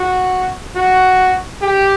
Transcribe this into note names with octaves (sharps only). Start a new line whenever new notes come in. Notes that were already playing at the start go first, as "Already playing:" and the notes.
Already playing: F#4
F#4
G4